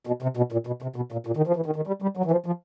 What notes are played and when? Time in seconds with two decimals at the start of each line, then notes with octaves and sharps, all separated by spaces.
0.07 B2
0.22 C3
0.37 B2
0.52 A#2
0.67 B2
0.82 C3
0.96 B2
1.12 A#2
1.27 A#2
1.37 D#3
1.47 F3
1.56 E3
1.66 D#3
1.76 D#3
1.87 G3
2.02 G3
2.17 F#3
2.25 E3
2.31 F3
2.46 F3